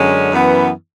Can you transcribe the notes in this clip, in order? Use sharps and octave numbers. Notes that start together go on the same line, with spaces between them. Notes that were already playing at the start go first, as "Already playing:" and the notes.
Already playing: F#2 D3 G#3 C#4
F#2 E3 B3